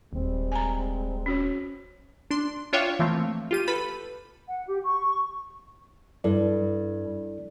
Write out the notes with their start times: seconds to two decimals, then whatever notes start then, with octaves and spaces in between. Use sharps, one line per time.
0.13 D#1 G3 G#3 C4
0.52 G#5 A#5
1.26 C#4 F#4 C#5
2.31 D4 C6
2.73 D4 F4 C#5 E5 F5 G5
2.99 E3 F3 A3 A#3 C4
3.51 F4 G4 D#7
3.68 A4 B4 B5
4.47 F#5
4.68 G4
4.83 C#6
6.24 G2 E4 A4 D5